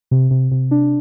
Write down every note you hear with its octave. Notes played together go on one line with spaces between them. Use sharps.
C3
C3
C3
D4